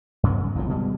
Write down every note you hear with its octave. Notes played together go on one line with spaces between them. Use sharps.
G2 C#3 F#3 B3
G#1 E2 A2 F3
B2 G3 G#3